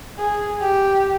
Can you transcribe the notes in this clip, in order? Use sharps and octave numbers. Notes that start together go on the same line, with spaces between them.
G#4
G4